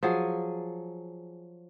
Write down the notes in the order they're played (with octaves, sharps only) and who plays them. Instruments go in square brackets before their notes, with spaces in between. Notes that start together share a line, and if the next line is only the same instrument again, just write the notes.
[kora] F3 F#3 G#4